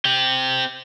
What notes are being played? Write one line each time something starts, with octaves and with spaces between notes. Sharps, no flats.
C4 G4